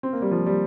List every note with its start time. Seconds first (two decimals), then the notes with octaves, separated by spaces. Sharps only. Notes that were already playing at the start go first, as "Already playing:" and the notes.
0.03 C4
0.13 A#3
0.22 G3
0.31 F3
0.46 G3